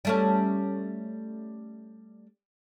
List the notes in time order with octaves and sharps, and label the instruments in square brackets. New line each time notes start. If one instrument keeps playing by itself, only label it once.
[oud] G3 A3 C#4